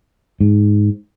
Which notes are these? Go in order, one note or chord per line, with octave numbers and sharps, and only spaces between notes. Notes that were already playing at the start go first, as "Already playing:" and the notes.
G#2